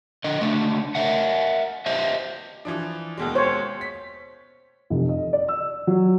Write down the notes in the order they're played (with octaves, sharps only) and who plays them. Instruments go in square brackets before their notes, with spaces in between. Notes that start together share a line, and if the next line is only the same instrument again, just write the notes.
[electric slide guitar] D3 D#5
C#3 A3 D4
A#4 D#5 E5 F#5
G4 C5 D#5 E5
[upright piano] E3 F3 D4
D#2 B2 G#3
[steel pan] C5 C#5
[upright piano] B6
[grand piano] F1
D#5
D5
E6
F#3